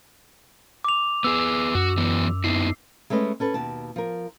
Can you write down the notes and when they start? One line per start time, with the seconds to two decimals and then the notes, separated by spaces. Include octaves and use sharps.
0.84 D6 F7
1.24 B3 G#4 E6
1.75 F#2 F#4
1.97 E3 F#3 B3
2.44 B3 D#4 E4 C7
3.10 G#3 A3 C#4 B4 D#5
3.40 C#4 A4 B4
3.54 D#2 B2 A5
3.96 F3 A#4